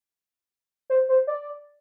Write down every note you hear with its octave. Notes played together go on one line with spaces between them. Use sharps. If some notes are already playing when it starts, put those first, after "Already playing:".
C5
C5
D5